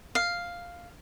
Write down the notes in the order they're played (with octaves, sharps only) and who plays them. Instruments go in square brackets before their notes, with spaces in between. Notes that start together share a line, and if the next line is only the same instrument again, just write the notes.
[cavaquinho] F5